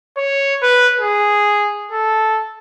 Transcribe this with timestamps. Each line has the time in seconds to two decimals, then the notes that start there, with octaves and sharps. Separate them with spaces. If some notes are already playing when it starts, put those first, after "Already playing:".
0.18 C#5
0.63 B4
1.00 G#4
1.91 A4